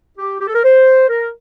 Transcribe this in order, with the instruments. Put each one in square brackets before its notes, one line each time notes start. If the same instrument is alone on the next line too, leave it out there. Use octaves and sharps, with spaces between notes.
[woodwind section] G4
G4
A4
A#4
C5
A#4